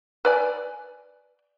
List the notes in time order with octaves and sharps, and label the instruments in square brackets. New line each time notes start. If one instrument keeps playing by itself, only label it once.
[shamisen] B4 D5 G#5